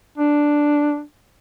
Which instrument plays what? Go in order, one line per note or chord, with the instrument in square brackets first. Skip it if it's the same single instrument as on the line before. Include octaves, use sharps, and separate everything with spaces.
[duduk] D4